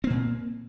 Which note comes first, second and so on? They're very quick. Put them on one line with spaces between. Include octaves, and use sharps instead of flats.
C4 A#3 A#2